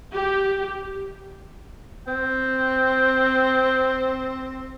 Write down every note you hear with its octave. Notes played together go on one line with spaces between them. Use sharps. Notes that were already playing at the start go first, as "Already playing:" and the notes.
G4
C4 G5